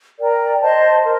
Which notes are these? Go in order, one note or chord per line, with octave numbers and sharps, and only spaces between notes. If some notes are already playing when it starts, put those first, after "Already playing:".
A#4 D5 G5 A#5
C5 D#5 A5 C6
A#4